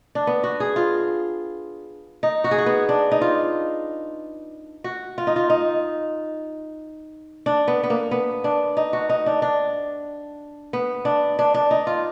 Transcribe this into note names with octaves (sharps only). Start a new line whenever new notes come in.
D4
B3
F#4
G#4
F4
D#4
F#4
G#4
F#4
B3
D4
D#4
F4
F#4
F4
D#4
F4
D#4
D4
B3
B3
A#3
B3
D4
D#4
F#4
D#4
D4
D4
B3
D4
D4
D4
D#4
F4